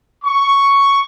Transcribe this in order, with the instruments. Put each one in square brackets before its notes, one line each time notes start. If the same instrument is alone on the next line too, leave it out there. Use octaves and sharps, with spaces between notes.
[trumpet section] C#6